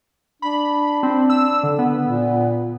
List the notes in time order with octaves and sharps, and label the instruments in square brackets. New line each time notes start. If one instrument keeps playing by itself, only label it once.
[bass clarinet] D4 [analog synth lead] B5
[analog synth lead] C4
E6
D3
B3
[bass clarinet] A#2